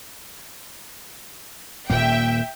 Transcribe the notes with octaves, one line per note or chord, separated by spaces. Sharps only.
D#1 A#2 A#3 E5 G5